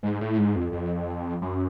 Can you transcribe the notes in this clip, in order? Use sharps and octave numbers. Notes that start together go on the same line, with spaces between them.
G#2
A2
G#2
F2
F2
F#2